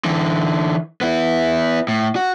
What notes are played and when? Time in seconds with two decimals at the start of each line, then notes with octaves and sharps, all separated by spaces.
0.05 D3 E3
1.01 B3 E4
1.88 A2
2.16 F#4